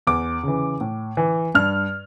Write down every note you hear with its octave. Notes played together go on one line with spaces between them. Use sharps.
E2 D6
C#3 E3
A2
E3
G2 F6